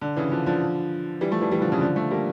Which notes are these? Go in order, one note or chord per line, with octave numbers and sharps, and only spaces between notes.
D3
C#3 E3
D3 F3
D3 F3
E3 G3
F3 A3
E3 G3
E3 G3
D3 F3
C#3 E3
D3 F3
F3 A3
G3 A#3